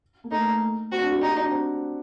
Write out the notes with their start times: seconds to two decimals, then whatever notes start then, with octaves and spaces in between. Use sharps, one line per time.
0.24 A#3
0.31 A3 D#4
0.92 C4 F#4
1.02 D4
1.12 F#4
1.21 D#4 G4
1.31 F#4
1.41 D4
1.51 C4